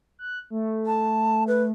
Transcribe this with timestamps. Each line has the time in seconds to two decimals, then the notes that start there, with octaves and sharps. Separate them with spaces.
0.19 F#6
0.50 A3
0.86 A5
1.48 B4